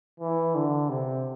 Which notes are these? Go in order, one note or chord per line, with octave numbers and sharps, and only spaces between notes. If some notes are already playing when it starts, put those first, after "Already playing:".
E3
D3
C3